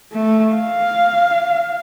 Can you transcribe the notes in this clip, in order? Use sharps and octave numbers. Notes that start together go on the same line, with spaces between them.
A3
F5